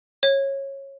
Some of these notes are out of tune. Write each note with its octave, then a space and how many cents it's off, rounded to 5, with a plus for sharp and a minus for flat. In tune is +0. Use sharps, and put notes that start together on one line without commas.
C#5 -20